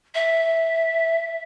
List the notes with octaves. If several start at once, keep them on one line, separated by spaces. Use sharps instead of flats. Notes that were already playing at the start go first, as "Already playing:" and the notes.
E5